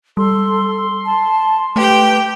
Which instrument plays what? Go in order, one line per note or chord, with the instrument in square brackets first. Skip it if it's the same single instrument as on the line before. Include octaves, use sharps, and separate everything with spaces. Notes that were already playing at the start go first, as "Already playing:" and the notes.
[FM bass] G3 [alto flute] A4 [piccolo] C6
[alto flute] A5
[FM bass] A3 [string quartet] G4 G5 [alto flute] B4